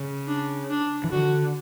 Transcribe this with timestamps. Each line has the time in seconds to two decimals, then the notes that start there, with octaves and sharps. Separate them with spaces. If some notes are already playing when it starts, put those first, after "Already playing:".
Already playing: C#3
0.28 D4
0.70 D4
1.04 E3
1.12 D3 F#4